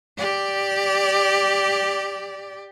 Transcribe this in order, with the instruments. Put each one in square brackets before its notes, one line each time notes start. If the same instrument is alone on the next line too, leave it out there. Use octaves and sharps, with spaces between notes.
[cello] G4 D5